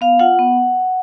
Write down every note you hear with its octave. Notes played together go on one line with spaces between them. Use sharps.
B3 F5
F4 F#5
B3